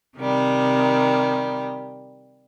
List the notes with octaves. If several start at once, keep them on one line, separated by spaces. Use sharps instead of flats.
C3 D#3 G3